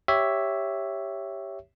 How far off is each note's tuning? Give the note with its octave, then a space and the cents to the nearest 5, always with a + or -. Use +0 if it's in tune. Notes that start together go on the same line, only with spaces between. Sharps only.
G4 +0 C#5 +0 E5 +0